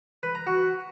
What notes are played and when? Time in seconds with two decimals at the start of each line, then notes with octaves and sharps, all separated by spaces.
0.23 B4
0.35 A#5
0.47 F#4